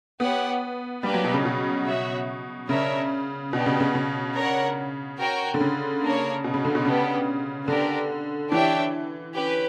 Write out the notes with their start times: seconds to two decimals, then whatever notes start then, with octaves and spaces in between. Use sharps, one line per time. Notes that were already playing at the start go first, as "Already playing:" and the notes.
0.20 B3 G4 C#5 F#5
1.03 G3 A#3 D4 G4 B4
1.14 F#3
1.24 B2
1.34 C#3
1.45 B2
1.86 F#4 C#5 E5
2.69 C#3 D4 A#4 C#5 E5
3.53 B2 B3 D4 G4
3.66 C#3
3.80 C#3
3.95 C#3
4.36 D4 A#4 C#5 F#5
5.19 F#4 A#4 C#5 G5
5.54 D3
5.60 C#3
6.02 A#3 D4 A#4 C#5
6.44 B2
6.54 C#3
6.65 D3
6.75 B2
6.85 C#3 B3 D4 G4
7.68 D3 B3 D4 G4 A#4
8.51 E3 D4 G4 C#5 E5 G5
9.35 C#4 G4 B4